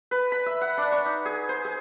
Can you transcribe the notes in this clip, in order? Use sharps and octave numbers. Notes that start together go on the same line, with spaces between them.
B4
B5
E5
F#5
D4
C#6
D#4
G#4
C5
G#4